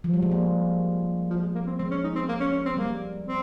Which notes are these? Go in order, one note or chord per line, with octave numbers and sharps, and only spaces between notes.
F3
G3
G#3
A#3
F3
G#3
A#3
C4
G#3 C4
C#4
D#4
C4
A#3
C#4
C#4
C4
G3 A#3
C4